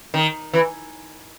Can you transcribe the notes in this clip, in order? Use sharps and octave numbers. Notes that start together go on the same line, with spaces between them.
D#3
E3